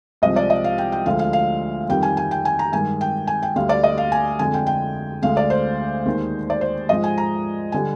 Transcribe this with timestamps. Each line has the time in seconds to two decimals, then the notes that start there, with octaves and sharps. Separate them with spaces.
0.22 C2 C3 F3 G#3 D#5
0.36 D5
0.50 D#5
0.64 F5
0.78 G5
0.92 G5
1.05 D2 D3 F3 G#3 F5
1.19 F5
1.33 F5
1.89 F2 D#3 G3 G5
2.03 G#5
2.17 G#5
2.31 G5
2.45 G#5
2.59 A#5
2.72 G2 D#3 G#3 G#5
3.01 G5
3.27 G#5
3.43 G5
3.56 D2 D3 G3 F5
3.69 D5
3.84 D#5
3.98 F5
4.12 G#5
4.39 F2 D3 G#3 G#5
4.54 G5
4.67 G5
5.22 D2 D3 G#3 F5
5.37 D5
5.50 C5
6.05 D#2 D#3 G#3
6.50 D5
6.61 C5
6.89 G#2 F3 G#3 D#5
7.04 G#5
7.18 A#5
7.72 D3 G3 G#5